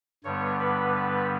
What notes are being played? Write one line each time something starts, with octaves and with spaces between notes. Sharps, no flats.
G2 D3 G3 B3 C#5
B4
B4